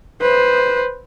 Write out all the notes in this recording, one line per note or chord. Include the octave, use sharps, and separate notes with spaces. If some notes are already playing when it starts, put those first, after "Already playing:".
B4 C5